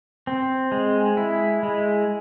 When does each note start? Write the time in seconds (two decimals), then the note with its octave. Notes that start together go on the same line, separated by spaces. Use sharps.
0.27 C4
0.72 G#3
1.17 E4
1.63 G#3